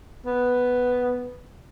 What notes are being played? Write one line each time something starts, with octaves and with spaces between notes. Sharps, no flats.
B3